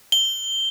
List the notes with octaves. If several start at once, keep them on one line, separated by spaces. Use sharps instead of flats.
G7